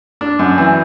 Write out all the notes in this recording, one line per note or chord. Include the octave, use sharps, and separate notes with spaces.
D4
F#2
E3